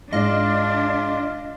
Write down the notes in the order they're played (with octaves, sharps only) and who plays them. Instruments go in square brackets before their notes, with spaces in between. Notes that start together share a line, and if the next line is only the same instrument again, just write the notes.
[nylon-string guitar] G#2 D5 [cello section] D4 [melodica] F4 [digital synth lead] D#5